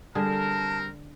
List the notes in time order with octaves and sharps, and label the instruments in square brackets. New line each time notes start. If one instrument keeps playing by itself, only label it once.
[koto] D3 G#4 [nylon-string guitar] G3 [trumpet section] C4 A#4 [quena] A5